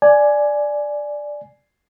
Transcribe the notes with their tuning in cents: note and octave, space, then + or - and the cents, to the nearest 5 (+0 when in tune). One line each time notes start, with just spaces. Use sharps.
D5 +0 G#5 +10